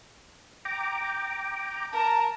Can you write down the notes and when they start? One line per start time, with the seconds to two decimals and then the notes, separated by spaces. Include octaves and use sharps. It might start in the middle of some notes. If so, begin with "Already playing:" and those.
0.65 G5 A#5 D6
1.92 A#4 A5 A#5